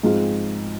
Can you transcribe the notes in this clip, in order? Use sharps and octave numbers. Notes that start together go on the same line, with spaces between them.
G#2 F3 G#3 C4 F4